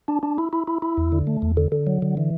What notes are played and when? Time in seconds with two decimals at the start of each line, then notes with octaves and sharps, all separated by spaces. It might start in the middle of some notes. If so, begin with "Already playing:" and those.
0.08 D4
0.23 D4
0.38 E4
0.53 E4
0.68 E4
0.82 E4
0.97 E2
1.12 D3
1.27 A3
1.42 E2
1.57 D3
1.72 D3
1.87 F#3
2.02 D3
2.17 E3